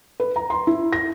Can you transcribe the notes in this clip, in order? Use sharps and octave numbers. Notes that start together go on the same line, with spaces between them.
B4
A#5
C6
E4
A#6